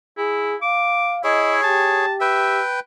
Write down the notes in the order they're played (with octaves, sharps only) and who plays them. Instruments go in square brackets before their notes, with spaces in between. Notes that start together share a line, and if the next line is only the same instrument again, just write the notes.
[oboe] E4 [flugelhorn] G#4
[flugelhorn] F5 [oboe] D6
[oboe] E4 [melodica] G#4 C#5 [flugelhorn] D#5
[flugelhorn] G4 [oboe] A5
[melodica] B4 G5 [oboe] E5